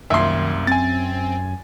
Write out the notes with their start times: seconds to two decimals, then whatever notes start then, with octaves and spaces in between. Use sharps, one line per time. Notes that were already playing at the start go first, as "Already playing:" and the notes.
0.10 C2 F#2 D#3 A#3 E5 C6
0.67 C4 G#5 A6